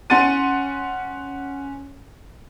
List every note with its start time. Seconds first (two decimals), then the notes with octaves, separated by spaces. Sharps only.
0.10 C#4 F#5 C6 A6 D#7